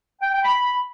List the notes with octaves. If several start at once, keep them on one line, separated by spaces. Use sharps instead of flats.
G5
G5
B5